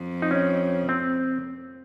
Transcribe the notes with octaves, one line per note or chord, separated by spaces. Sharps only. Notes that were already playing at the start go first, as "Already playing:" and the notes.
Already playing: F2
D#4
C#4
C4